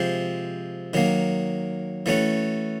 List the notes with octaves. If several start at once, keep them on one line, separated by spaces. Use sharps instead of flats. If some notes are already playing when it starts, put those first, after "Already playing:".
Already playing: C3 F3 G#3
D#3 F#3 A#3
E3 A3 C#4 F#4